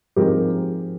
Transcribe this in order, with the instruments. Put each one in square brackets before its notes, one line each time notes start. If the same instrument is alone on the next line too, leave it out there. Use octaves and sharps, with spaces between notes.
[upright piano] G#2 F3 G#3 C4 G4 A#4